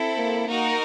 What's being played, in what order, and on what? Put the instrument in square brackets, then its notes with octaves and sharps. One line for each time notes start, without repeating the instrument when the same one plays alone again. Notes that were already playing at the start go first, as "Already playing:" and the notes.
Already playing: [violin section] C4 E4 A4
[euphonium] A#3
[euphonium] A#3 [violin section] D#4 F#4 A#4